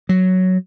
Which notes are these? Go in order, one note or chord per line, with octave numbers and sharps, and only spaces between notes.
F#3